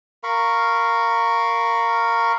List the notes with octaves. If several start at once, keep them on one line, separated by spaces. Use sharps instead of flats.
A#4 F5 B5 C#6